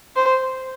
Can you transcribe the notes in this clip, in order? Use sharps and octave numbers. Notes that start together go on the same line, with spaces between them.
C5